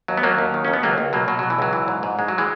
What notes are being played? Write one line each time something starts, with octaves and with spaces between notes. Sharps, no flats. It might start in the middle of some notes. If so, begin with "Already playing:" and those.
D#2 F#3
B3
D#2 F#3 A#3
D#2
D#3
D#2 C#4
B3
C#2 F#3 A#3
C#2
B2 F#3 A#3
B2 F#3
B2 F#3
E3
C#2 F#3
E3
G#2
G#2
G#2 G#3
F#3
E3 G#3